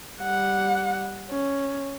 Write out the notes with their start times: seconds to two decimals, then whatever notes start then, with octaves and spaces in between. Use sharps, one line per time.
0.21 G3 F#5
1.29 C#4